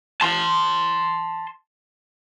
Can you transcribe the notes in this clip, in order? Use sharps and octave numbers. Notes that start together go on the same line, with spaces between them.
A5 C6